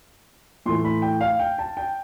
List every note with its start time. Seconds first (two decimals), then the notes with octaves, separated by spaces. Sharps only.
0.66 A2 E3 A3 C6
0.84 B5
1.02 G5
1.21 F5
1.39 G5
1.58 A5
1.77 G5